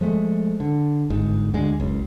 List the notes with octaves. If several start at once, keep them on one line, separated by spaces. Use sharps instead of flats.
F3 G#3 A3
D3
G1 G#2
D2 D3 G#3
F#1 C#2